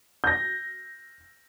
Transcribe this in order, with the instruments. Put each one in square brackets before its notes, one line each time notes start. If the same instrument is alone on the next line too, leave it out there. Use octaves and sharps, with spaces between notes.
[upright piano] G6 A#6